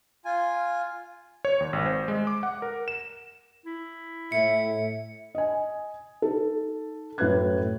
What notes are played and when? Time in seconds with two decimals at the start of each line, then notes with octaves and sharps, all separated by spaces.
0.25 F4 G#5
1.45 C#5
1.60 D#2
1.73 G#1
1.85 C5
2.08 G#3
2.27 D6
2.43 F#5
2.62 A#4
2.88 E7
3.66 E4
4.32 A2 E5 C#7
5.35 D#5 G#5
6.22 D#4 A4
7.18 F#2 A2 F#4 B4 F#6 G#6